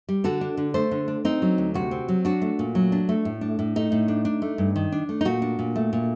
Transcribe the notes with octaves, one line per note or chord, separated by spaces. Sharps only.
G3
D3 F#4 A4
D4
D3
A3 A4 C5
D3
D4
C4 D#4
F#3
D2
C3 F#4
C4
F#3
D4 F#4
A3
A#2
F#3
D4
A3
A2
D4
A2
A3 D#4
A2
D4
D4
A3
G2
D#3
D4
A3
D#4
A#2 F#4
D4
A#2
A3
A#2